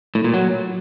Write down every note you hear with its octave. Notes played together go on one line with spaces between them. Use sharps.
A2
A#2
F#3